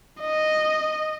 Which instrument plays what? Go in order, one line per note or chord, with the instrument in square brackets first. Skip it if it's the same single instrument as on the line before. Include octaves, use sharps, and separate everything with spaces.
[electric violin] D#5